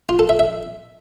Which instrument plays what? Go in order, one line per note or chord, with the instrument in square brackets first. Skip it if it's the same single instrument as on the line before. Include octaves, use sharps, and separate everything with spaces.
[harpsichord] F4
A4
E5
E5